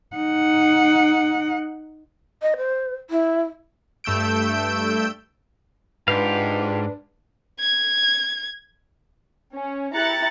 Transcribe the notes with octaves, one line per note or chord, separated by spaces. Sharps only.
D#4 F#5
D#5
C5
E4
G2 A3 E6 G6 D7
G#2 D4 F4 G4 B4 F5
G#6
C#4
E4 G4 A#5 F#6 A6 C#7